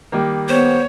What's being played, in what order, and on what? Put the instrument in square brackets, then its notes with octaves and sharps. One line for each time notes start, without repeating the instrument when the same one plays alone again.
[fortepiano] D#3 G3 A#3
[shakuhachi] B3 [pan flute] C5 [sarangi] C#5